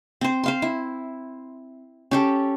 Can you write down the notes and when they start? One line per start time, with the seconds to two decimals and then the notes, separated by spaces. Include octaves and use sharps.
0.21 C4 C5
0.44 C5 F5 C6
0.62 E4
2.11 C#4 G4 A4